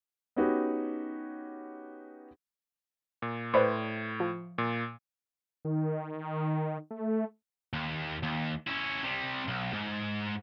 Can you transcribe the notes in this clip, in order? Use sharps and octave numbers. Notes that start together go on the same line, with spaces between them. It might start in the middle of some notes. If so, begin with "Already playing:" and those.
B3 C#4 D#4 F#4 G4 B4
A#2
A2 B4 C5 D5
F3
A#2
D#3
A3
D#2
D#2
C#4 E4
C3 G3
B1
G#2